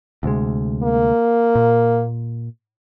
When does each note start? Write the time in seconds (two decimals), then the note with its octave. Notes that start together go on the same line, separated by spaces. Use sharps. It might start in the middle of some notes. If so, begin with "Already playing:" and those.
0.23 D2 C3 G#3
0.83 A#3
1.55 A#2